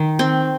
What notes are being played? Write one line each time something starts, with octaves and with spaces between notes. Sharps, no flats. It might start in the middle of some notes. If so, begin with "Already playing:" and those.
Already playing: D#3
C4